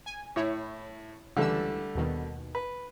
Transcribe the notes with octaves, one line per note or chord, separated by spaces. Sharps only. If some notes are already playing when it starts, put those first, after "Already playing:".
G#5
A2 E4 C#5
C#2 D3 E3 G3 A3 E6
D#2 B2 D#3
B4